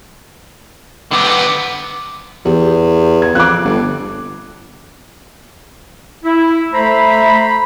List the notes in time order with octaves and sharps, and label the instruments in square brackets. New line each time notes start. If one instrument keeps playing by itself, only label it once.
[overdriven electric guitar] D3 B3 [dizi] D6
[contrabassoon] E2 [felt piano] G4
[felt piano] G#6
[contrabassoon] F2 [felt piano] D6 F#6
[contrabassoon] G1
[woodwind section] E4
[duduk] A3 [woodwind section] C5 A#5 B5